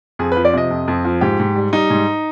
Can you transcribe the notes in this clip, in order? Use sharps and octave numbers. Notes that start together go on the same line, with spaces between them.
F2 G#4
B4
F3
D5
C3 D#5
F2
F2
F3
G#2 G4
G#2
G3
G3 D#4
G#2